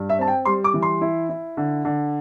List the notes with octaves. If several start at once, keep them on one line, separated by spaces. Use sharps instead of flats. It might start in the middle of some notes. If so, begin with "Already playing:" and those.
Already playing: G2
E5
C4 A5
G5
G3 C6
D6
E3
C6
E4
E4
D3
D3